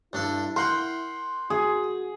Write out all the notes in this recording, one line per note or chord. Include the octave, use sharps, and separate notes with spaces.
G2 D4 E4 A4
A#4 F#5 G5 C6
F#4 G#4